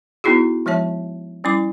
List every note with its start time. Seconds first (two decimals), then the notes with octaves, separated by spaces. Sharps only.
0.24 B3 D#4 E4 F#4 G#4
0.66 F3 G#3 C#5 E5 A5
1.44 G3 C#4 E4 D6